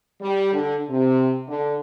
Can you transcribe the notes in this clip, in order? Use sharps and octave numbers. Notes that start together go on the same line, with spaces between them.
G3
D3
C3
D3